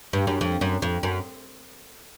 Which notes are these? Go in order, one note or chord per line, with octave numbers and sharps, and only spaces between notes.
G2
F#2
F2
F#2
F2
F#2